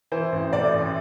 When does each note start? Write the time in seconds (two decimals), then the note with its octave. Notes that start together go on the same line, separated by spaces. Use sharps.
0.12 E3 C5
0.32 A1
0.53 A2 D5
0.74 A1